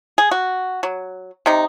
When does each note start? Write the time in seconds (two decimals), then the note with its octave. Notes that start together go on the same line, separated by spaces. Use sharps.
0.18 G#4
0.31 F#4
0.83 F#3
1.46 C3 D#4